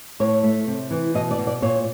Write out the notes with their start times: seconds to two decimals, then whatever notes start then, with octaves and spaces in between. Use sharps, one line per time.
0.20 A2 C#5
0.43 A3
0.67 C3
0.91 E3
1.14 B2 D#5
1.31 D5
1.39 B2
1.47 D5
1.62 A#2 C#5